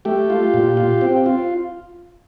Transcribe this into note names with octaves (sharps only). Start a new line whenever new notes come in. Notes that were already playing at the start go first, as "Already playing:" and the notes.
A3 G4
F4
A#2
F4
C4
F4